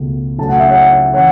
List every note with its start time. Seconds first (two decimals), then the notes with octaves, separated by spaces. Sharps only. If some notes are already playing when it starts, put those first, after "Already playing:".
Already playing: C#2 B2 A3
0.38 C#2 C#3 F#3 A3 A5
0.49 F#5
0.59 E5
0.69 C#5 F#5
1.13 C#3 E3 C#5 F#5